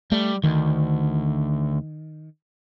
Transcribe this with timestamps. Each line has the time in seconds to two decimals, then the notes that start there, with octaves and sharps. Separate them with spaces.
0.12 G3 A3
0.44 D2 D#3